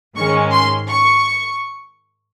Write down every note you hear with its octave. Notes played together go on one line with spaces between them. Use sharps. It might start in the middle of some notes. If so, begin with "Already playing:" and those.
G#2 D#3 G#3 C#4 C#6
C6
C#6